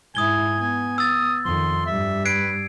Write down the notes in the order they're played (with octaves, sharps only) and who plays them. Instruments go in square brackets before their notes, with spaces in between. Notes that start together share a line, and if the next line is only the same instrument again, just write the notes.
[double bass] G#2 E4 [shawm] G#5 [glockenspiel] D#6 G#6 G7
[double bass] B3 [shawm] G#5
[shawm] D#6 [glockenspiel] E6 A6
[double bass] F2 D#3 [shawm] C6
[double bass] G2 G3 [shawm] E5
[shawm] B4 [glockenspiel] G#6 C7 D7